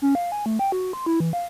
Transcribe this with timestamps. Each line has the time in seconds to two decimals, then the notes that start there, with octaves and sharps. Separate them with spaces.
0.02 C#4
0.15 F5
0.32 G#5
0.46 A3
0.59 G5
0.72 F#4
0.93 C6
1.06 E4
1.20 E3
1.33 F5